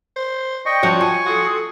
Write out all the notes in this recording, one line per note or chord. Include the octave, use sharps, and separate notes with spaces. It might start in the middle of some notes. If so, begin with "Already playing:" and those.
C5
D5 D#5 G5 C#6
F3 C#4 F#4 C#5
F3 G#5 C#6
F#4 A4 C6 D#6